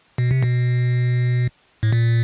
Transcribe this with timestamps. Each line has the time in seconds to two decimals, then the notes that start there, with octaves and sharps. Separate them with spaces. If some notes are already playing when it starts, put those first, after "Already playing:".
0.18 B2
0.31 C3
0.43 B2
1.83 A2
1.93 A#2